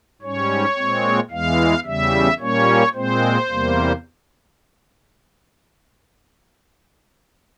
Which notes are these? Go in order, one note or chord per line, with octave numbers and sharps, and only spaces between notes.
G#2 G3 C#4 C#5
A#2 G#3 C4
E2 E3 G#3 F5
E2 C#3 G3 E5
A#2 G3 A#3 C#4 C#5
A#2 G#3 C4 C5
E2 C3 G3 A#3